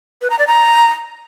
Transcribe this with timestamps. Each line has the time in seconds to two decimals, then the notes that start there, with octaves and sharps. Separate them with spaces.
0.22 B4
0.30 A#5
0.39 D5
0.47 A#5